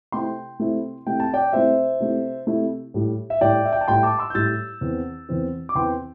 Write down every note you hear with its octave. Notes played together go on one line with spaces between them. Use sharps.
C3 A3 C4 E4 G5 C6
C3 A3 C4 E4
C3 A3 E4 G5
A5
D5 G5
C3 A3 E4 C5 E5
C3 A3 E4
C3 A3 E4
A2 G3 E4
E5
A2 G3 E4 D5 G5
E5
G5
A5
A2 G3 E4 G5 C6
A5 D6
C6 E6
G6
A2 G3 E4 E6 A6
E2 E3 C4
E2 E3 C4
D6
E2 E3 C4 G5 C6